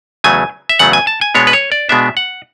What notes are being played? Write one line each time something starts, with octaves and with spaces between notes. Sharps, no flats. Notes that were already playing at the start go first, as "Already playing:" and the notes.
E2 C#3 F#3 A3 G#5
E5
E2 C#3 F#3 A3 F#5
G#5
A5
G#5
B2 G#3 B3 D4 C#5
B4
C#5
D5
B2 G#3 B3 D4 E5
F#5